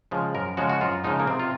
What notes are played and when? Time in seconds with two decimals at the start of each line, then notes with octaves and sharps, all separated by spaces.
0.11 C#3 F3 G#3
0.34 F#2 A#4
0.57 C#3 F3 G#3 F#4
0.69 F#4
0.81 F#2 F4
1.04 C#3 F3 G#3 D#4
1.20 A#3
1.27 C3 C4
1.40 F4